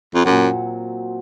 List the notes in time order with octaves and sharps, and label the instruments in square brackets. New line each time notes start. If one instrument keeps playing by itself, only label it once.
[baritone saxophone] F2
[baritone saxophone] F#2 [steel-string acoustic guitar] A#2 F#3 C4 F#4